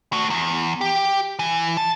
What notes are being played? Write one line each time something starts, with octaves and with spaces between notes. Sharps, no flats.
A3 F#4
E2
G4
E3
A5